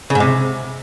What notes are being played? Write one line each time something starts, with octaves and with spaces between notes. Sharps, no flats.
C#3
G#2
C3